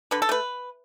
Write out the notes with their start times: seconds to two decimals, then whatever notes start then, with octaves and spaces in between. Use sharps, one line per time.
0.11 D3 B4
0.22 A4
0.29 A3 B4